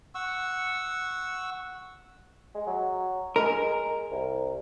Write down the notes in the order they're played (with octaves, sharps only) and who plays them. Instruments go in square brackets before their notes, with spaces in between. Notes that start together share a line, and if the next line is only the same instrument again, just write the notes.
[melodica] F#5 C#6 E6
[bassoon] G#3
F#3
[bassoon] G#3 [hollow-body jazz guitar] A#4
[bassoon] C2